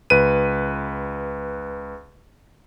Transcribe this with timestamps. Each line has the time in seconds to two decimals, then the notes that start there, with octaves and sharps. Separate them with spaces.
0.10 C#2 B4 D#7